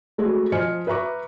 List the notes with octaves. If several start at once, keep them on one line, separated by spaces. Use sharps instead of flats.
G#3 A3 F#4 G#4
F3 C5 D#5 G#5 F6 C#7
B4 E5 A#5 C#6 D6